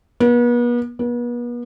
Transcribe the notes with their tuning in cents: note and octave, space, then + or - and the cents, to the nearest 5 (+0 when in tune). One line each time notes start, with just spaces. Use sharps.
B3 -40
B3 -40